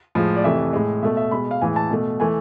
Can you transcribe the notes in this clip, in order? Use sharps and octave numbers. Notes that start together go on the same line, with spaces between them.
A2 F3 G#3
D5
F2 C3 E3 A3 E5
A2 G#3
B2 A3 E5
E5
B2 G#3 B5
F5
A2 E3 G#3 G#5
A5
B2 A3
E3 A3 G#5